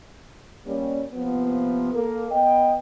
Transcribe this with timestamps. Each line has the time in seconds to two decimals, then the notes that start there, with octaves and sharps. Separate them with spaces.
0.66 G3 A#3 C#4
1.13 C3 F3 A#3 B3
1.93 A#3 A4 A#4
2.31 B3 D#5 G5